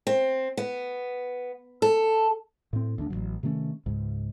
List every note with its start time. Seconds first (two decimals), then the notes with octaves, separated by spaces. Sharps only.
0.07 C4
0.57 B3
1.82 A4
2.73 A2 C4
2.98 D2 A#3 D4
3.10 A1 D#3 F#3
3.43 C3 D#3 A3 C#4
3.86 C#2 G#2